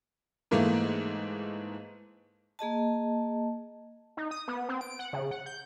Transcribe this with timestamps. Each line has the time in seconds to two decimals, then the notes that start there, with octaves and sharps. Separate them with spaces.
0.51 G#2 E3 A3 A#3
2.59 A#3 G#4 D#5 A5
4.17 D#4
4.31 D#6
4.48 B3
4.69 C4
4.81 D7
4.99 F#5
5.13 C#3
5.31 F#5
5.46 G6